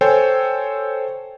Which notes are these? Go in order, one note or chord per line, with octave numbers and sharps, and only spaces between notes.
A4 C5 C#5 G5 G#5